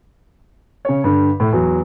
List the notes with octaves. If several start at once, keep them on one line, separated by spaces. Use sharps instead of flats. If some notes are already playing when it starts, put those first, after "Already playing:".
C#3 C#5
G2 D3
A2
E2 F#3